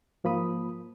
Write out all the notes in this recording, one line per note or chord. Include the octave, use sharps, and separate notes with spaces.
G#2 F3 A#3 B5 D#6